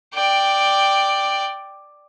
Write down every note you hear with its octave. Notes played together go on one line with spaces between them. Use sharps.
D5 G5